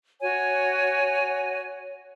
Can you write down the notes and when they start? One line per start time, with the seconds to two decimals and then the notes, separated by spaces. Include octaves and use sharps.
0.21 F#4 C#5 G#5